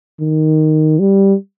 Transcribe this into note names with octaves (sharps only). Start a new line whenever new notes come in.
D#3
G3